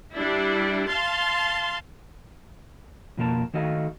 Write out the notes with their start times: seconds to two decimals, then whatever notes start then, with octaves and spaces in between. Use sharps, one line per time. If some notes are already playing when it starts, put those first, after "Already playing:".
0.14 G3 D4 E4
0.90 F5 A5 C6
3.17 F2 B2 A#3 A#4 A5
3.54 D#3 A3 F#4 A4 D#5 F5